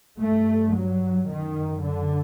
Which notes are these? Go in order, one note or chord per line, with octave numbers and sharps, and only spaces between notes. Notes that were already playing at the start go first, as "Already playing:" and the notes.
G2 A3
F#3
F#2 D#3
D3